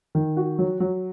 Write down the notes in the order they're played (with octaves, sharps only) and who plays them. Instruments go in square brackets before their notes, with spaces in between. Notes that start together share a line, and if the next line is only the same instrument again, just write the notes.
[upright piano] D#3
F#4
F#3
F#3